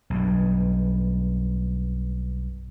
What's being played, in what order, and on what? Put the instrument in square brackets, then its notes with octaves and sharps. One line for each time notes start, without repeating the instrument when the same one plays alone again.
[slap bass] B1 G2